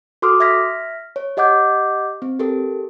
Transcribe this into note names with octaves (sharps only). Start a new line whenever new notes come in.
F#4 A4 C6 D6 D#6 F6
E5 F6 G#6 A#6 B6
C#5
G4 D#5 F#5 D6 G6
C4
G4 A4 A#4